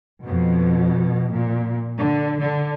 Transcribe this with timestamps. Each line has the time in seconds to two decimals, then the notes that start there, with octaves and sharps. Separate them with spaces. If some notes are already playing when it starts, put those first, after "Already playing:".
0.22 F2 B2
1.32 A#2
1.97 D3
2.41 D3